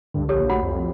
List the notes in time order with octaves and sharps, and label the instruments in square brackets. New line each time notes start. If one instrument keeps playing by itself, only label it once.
[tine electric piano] C#2 D3 [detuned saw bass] G2
[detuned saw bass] A#1 [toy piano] G4 A4 C#5
[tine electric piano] A1 A3 G4 [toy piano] F#4 F#5 B5
[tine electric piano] C2 [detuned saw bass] F2